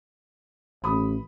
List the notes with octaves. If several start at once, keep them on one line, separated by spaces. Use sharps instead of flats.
A1 B5 D#6